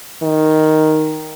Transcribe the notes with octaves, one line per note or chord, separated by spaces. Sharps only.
D#3